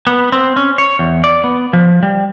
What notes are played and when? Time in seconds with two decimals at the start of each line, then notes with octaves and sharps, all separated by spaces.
0.07 B3
0.32 C4
0.56 C#4
0.78 C#5
0.99 E2
1.24 D5
1.44 B3
1.73 F3
2.03 G3